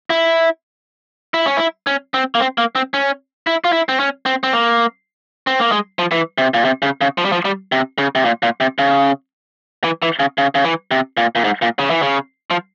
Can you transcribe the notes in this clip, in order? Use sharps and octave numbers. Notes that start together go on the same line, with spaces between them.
E4
E4
C#4
E4
C#4
C4
A#3
C4
A#3
C4
C#4
E4
F4
E4
C4
C#4
C4
C4
A#3
C4
A#3
G#3
F3
E3
C3
A#2
C3
C#3
C#3
F3
G3
F3
G3
C3
C#3
C3
A#2
A#2
C3
C#3
E3
E3
C#3
C#3
C#3
E3
C3
A#2
A#2
G#2
A#2
C#3
E3
C#3
F3